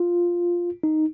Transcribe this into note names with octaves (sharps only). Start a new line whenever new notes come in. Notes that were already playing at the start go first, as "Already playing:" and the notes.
Already playing: F4
D#4